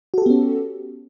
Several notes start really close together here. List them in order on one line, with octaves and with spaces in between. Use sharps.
F#4 A4 G4 B3 C#4